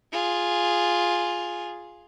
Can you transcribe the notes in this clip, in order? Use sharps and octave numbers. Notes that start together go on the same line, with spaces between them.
F4 G#4